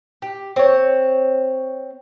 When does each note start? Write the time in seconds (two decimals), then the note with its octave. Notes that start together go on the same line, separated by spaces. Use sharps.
0.22 G4
0.56 C4 C#5